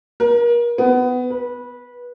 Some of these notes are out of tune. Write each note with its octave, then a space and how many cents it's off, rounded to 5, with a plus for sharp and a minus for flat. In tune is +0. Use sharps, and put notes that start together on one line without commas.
A#4 +35
B3 +20
B4 -20